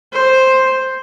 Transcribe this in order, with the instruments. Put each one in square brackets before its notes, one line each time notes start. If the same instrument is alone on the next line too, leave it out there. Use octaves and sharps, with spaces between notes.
[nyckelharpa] C5